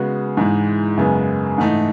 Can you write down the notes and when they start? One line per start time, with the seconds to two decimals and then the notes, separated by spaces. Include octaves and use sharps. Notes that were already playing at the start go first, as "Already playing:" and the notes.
Already playing: C#3 G#3 B3 F#4
0.37 G#2 E3 G#3
0.98 F#2 C#3 G#3 B3
1.58 G#2 E3 A3 D#4